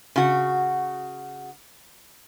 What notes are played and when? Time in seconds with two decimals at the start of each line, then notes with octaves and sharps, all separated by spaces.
0.16 C#3 F#4